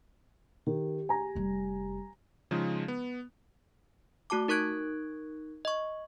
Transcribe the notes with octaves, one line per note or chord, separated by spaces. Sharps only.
D#3 G4
G#5 A#5
F1 G3
C#3 F3 G#3 D#4 F4
B3
A3 F#4 A5 D6
D#4 A#4 C#6 F#6 G#6 D7
D#5 C#6